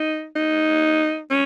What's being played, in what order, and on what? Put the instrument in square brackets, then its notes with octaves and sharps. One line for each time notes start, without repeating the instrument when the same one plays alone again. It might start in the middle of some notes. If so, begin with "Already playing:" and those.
Already playing: [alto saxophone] D#4
D#4
C#4